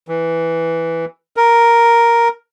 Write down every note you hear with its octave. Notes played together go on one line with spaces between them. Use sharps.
E3
A#4